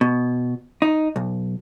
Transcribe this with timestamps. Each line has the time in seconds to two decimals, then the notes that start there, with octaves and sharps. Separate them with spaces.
0.01 B2
0.82 D#4
1.16 B1